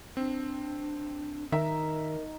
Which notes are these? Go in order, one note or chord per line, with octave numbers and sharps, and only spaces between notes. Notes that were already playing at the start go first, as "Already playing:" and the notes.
C4 D4
D#3 D#4 A#4 E5